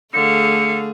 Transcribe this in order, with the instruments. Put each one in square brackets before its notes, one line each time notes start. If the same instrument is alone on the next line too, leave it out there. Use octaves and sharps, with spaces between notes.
[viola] D3 F5 [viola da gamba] A3 G#4 [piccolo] C#7